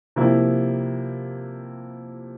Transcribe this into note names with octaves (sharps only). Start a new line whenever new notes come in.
C3 F3 A#3 E4 G4